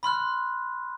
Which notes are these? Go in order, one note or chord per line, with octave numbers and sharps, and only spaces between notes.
B5 C6 F6 F#6